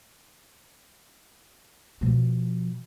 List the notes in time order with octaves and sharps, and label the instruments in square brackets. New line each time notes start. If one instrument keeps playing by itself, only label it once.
[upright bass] B2 F3